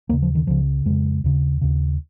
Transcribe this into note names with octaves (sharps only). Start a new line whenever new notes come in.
D#2 C#3 A#3
F3
D#3
C#2 C#3 F3
F2 C#3 G#3
D#2 C#3
D#2 C#3